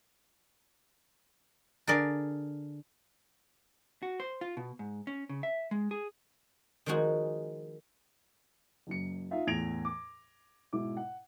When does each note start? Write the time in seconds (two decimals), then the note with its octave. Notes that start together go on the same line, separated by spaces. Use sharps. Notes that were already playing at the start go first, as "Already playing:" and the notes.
1.87 D3 G#4 A#4 D5
4.03 F#4
4.20 C5
4.41 F4
4.57 B2
4.79 G#2
5.07 C#4
5.29 C#3
5.43 E5
5.71 G#3
5.91 G#4
6.86 D#3 F3 G#3 D#4 F#4 G#4
8.87 F#1 F#2 C#7
9.31 D#4 F4 E5 F5
9.47 E2 A2 G#6 A#6 D7 F7
9.85 D6
10.73 G#2 B2 E4 D6
10.97 F#5